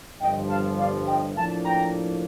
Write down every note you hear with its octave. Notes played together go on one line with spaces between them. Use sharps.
G1 G2 F3 D#5 G5
F5 A5
D5 F5
D#5 G5
A2 F3 A#3 D4 F5 A5
G5 A#5